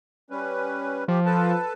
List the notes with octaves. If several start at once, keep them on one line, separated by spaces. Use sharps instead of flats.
G3 C#4 B4
F3 G4
A4 B4 A5